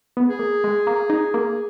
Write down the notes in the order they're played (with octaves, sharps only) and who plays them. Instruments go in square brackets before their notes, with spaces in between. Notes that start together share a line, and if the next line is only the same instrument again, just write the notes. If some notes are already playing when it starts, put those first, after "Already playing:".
[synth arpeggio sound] B3
[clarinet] G#4
[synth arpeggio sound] A#3
G#3
A#3
D#4
A#3